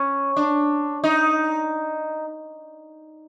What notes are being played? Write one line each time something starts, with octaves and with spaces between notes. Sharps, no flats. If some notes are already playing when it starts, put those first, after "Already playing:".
Already playing: C#4
D4
D#4